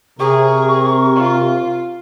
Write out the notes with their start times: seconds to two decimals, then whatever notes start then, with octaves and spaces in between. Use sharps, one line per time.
0.20 C3 G#4 A#4 C#6
1.16 F4